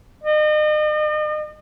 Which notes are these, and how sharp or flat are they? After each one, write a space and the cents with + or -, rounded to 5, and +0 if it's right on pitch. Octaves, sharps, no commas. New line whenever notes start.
D#5 -40